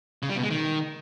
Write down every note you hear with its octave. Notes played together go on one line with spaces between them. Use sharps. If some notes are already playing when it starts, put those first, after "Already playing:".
C#3
G3
B2
G#3
D#3